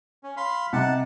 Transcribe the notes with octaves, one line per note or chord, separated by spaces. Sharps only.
C#4
F5 B5 C6
C3 D#4 F#5 A5